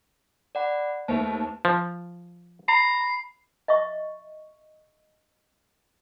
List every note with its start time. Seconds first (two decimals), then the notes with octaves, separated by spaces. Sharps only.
0.55 D5 F#5 B5
1.08 D#2 A3 B4 C5 A5
1.65 F3
2.68 A#5 B5 C7
3.68 D#5 E5 C#6